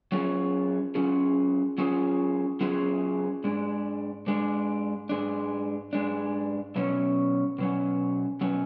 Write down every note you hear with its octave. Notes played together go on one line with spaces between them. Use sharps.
F#3 C#4 F4 G#4
F#3 C#4 F4 G#4
F#3 C#4 F4 G#4
F#3 C#4 F4 G#4
G#2 G#3 D4
G#2 G#3 D4
G#2 G#3 D4
G#2 G#3 D4
B2 F#3 C#4
B2 F#3 C#4
B2 F#3 C#4